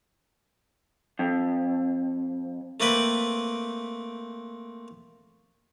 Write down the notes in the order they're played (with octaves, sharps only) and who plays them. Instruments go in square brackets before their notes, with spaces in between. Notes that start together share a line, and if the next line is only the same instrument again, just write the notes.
[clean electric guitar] F2
[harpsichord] A3 A#3 C4 B4 G5